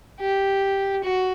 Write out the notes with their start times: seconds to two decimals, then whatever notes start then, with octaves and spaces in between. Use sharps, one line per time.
0.20 G4
1.03 F#4